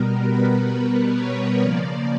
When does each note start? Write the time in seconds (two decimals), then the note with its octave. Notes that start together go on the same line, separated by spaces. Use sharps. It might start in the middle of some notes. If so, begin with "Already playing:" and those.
Already playing: B2 G3 B3 A#4
0.24 B4
0.68 B4
1.14 C#5
1.60 C#3 F3 A#3 D5